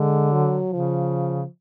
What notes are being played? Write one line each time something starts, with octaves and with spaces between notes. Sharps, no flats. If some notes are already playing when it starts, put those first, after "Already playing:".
Already playing: D3 G#3
F#3
C#3 F3